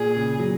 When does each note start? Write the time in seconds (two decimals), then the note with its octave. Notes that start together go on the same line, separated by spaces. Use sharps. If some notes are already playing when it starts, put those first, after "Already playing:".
Already playing: A#2 G#4
0.16 C#3
0.39 F#3